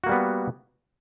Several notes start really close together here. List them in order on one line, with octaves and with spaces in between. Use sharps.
F#4 A#3 G3 B3